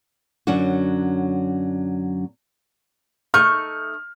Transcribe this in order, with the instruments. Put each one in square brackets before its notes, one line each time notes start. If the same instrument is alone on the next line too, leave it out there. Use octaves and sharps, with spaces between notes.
[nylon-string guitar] F#2 D3 F#3 C#4 D4 F#4
[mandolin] A3 D#4 C#6 [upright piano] F6